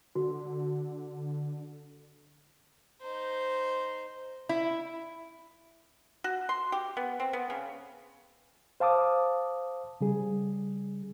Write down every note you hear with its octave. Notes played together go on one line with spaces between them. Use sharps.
D3 F#4
D#4 C5
E4
F#4
C6
G4
B3
C4
B3
C#3
C5 F5 A5 D6 D#6
C#3 G3 G#4